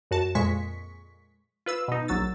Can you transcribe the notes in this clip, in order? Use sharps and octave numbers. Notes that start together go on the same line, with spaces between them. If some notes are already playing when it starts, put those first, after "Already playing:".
F#2 F#4 A5 E7
F2 A#2 G#3 C#6 B6
F4 B4 E6
B2 D#4
A#1 F#3 E6 A6